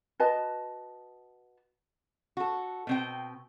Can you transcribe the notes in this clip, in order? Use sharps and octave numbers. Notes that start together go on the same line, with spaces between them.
F#4 B4 D#5 A5
F#4 A4
B2 C4 G5